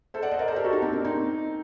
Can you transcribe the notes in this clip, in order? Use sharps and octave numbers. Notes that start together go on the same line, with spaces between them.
A4 C5
D5 F#5
C5 D#5
A#4 D5
A4 C5
G4 A#4
F#4 A4
D#4 G4
C4
A#3 D4
C4 D#4